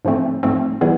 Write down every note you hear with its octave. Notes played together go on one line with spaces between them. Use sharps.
G#2 F3 A3 C4
G#2 F3 A3 C4
E3 G3 B3 E4 G#4